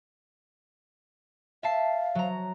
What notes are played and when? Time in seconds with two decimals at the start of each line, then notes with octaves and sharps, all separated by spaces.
1.63 E5 F5 A5 C7
2.15 F#3 A#5